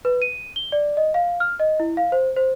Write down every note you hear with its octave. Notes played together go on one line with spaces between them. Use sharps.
B4
D#7
G7
D5
D#5
F5
F6
D#5
E4
F5
C5
C5